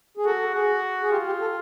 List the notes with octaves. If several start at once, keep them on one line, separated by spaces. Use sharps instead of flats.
G#4
F#4 A4
A4
F#4 G#4
G#4
F4 G4
G4
A4